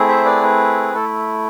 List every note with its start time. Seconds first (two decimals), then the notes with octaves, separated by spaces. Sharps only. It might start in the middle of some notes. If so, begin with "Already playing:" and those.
Already playing: A3 C4 E4 G#4
0.08 C5 E5
0.25 B4 D5
0.43 B4
0.94 A3 E4 A4